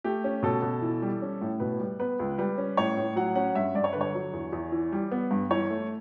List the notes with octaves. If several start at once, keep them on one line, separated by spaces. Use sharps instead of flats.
A3 G4
C#4
B2 A4
B2
E3
G3
C#4
A2
B2 B4
G3
B3 B4
C#2
G3 B4
C#4
A2 C#5
A2
F#3 F#5
C#4 F#5
G2 E5
G2 D5
C#5
D3 B4
C#5
F#3
E2
E2
E3
G3
B3
G2
E3 C#5
A3